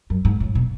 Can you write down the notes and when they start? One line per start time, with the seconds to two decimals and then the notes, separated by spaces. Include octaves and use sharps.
0.10 F#2
0.25 G#2
0.40 A2
0.55 B2